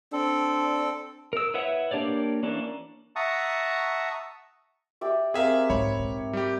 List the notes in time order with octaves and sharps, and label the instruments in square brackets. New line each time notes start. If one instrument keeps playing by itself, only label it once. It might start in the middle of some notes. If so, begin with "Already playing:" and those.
[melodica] C4 A4 [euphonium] D4
[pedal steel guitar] A#4 E6
E4 B4 C#5 E5 F#5
A#3 D4 G4 C#5 D5
E3 A#3 C#4 D4
[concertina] E5 F#5 A5 A#5 C#6 D#6
[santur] G4 D5 E5
[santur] C4 A#4 [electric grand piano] G#4 E5 F5
[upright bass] G#2 [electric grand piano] C#5 B5
[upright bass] G#2
[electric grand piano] G3 G4